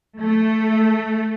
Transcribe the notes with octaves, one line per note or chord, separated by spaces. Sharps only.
A3